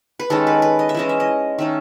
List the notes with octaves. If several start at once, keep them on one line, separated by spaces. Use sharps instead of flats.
B4
D#3 G#3 C#4 A4
B4
B4
D#5
E5
E3 G#3 C#4 D#5
E5
D#5
D#3 A3 C#4 E5